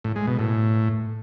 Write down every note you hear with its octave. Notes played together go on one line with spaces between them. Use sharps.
A2
G#3
B2
A2